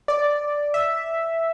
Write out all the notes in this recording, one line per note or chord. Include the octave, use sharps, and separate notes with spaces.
D5
E5